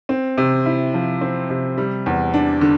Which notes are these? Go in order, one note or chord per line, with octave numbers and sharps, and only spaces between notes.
C4
C3
E4
F3
C4
C3
G3
E2
D4
D3